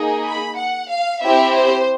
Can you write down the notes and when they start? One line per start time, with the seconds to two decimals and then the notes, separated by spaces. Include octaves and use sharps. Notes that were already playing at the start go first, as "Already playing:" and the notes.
Already playing: A#3 D#4 G#4
0.25 B5
0.57 F#5
0.90 F5
1.22 C4 E4 G4 E5
1.55 C5